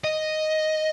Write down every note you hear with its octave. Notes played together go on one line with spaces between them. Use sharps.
D#5